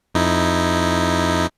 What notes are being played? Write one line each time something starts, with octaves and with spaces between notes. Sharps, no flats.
F2 D#4 E4